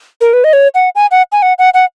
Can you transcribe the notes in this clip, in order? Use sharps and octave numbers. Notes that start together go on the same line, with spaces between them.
A#4
B4
D#5
C#5
F#5
G#5
F#5
G#5
F#5
F#5
F#5